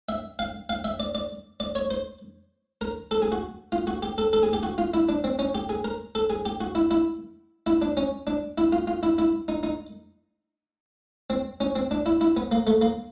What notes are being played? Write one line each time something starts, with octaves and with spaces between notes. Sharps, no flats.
E5
F5
F5
E5
D5
D5
D5
C#5
C5
A#4
A4
G#4
F#4
F4
F#4
G4
A4
A4
G#4
G4
F#4
F4
E4
D4
C4
C#4
G4
G#4
A#4
A4
G#4
G4
F#4
E4
E4
E4
D4
C#4
D4
E4
F4
F4
E4
E4
D#4
D#4
C4
C#4
C4
D4
E4
E4
B3
A#3
A3
A#3